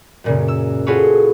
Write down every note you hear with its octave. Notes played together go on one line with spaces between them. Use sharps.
F#2 A#2 C#3
E6
F4 F#4 G#4 A4 B4 C#5